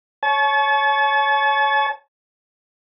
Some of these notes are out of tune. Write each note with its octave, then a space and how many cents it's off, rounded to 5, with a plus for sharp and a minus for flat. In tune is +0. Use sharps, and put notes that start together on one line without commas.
C#5 +0 A5 -45